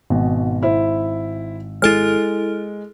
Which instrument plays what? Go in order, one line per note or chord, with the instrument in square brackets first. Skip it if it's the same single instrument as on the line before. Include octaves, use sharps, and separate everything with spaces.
[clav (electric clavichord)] G#1 [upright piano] B2
[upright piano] E4 C5
[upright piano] G#3 [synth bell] E4 A4 F6